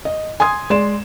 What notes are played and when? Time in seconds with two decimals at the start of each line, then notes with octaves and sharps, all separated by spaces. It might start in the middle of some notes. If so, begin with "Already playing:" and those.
0.05 D#5
0.40 G#5 C6 D#6 G#6
0.70 G#3 D5 C6 E7